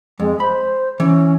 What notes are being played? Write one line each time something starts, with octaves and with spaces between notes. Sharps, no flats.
F2 G#3
C5 B5
E3 C#4